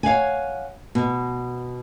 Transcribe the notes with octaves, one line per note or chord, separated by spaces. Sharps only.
C#5 F5 F#5 G#5
B2